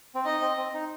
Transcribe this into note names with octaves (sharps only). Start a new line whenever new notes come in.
C4
D#4 D#5
C4
C4
D#4